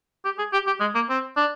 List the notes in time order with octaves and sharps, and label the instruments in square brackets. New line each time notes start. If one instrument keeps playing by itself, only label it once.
[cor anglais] G4
G#4
G4
G4
G#3
A#3
C4
D4